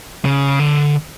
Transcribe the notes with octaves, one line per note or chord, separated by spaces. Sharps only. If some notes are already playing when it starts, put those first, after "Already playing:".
C#3
D3